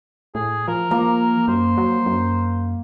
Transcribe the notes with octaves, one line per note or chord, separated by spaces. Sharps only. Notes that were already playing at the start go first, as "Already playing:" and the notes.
A2 G#4
F3 A#4
F3 A#3
F#2 C5
F#3
F#2